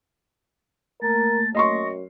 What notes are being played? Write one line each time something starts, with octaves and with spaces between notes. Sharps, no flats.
A3 A#3 A#4 A6
F#2 D#5 C6 C#6 A#6